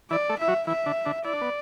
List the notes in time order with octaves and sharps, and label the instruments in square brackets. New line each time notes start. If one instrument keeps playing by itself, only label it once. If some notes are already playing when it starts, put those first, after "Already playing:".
[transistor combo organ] E3 E4 [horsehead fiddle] D5
[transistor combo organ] A3 A4
[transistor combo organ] E4 [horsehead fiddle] E5
[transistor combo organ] F#3 F#4
[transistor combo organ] E3 E4 [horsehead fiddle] E5
[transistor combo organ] D3 D4
D3 D4
[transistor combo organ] E4 [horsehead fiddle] D5
[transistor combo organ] D4
B3